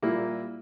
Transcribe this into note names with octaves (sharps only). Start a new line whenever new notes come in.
A#2 G3 A#3 E4